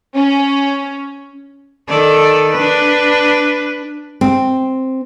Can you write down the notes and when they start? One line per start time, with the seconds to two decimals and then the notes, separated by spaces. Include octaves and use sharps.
0.16 C#4
1.88 D#3 A4 D5
2.53 D4 B4
4.21 C4